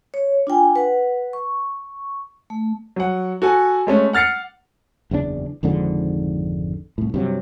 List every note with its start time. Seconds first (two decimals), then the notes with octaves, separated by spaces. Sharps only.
0.14 C#5
0.47 D4 F4 G5 G#5
0.76 B4 F#5
1.33 C#6
2.50 A3
2.96 F#3 F#5
3.42 F#4 A4 G#5
3.87 G#3 A3 C#4
4.13 F#5 F6 A6 C7 C#7
5.11 F#1 E2 C#3 D4
5.63 G#1 F2 G#2 D3
6.98 C2 A2
7.14 G2 C3 F#3